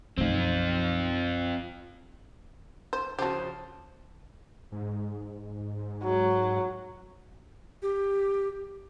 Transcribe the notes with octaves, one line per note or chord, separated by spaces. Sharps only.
B1 F#2 F3 C4 D#4 F4
C5
C#3 F3 F#4 G4 C5
G#2
F#3
G4